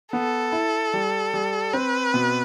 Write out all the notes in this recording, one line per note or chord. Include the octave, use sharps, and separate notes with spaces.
B3 A4
E4
G3
G3
C4 B4
B2